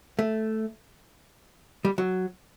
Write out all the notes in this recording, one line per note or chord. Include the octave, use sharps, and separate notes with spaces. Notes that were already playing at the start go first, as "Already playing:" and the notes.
A3
G3
F#3